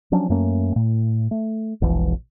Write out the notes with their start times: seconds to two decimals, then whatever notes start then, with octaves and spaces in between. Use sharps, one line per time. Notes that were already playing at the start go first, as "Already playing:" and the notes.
0.12 F3 F#3 C#4 D4
0.29 F#2 A3 A#3 C#4
0.76 A2
1.31 A3
1.82 E1 A#1 E3